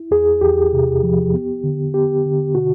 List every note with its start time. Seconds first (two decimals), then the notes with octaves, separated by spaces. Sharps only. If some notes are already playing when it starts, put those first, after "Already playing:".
Already playing: E4
0.11 E2 G#4
0.41 E2 G4
0.73 C3
1.03 F3
1.34 B3
1.63 D3
1.94 B3 G4
2.25 D3
2.55 B2 F#4